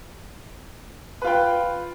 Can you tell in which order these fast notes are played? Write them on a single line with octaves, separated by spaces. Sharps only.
B4 F4 G5